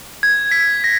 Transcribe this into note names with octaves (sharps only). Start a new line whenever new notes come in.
G#6
B6
A#6